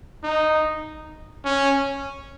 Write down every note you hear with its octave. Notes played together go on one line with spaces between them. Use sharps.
D#4
C#4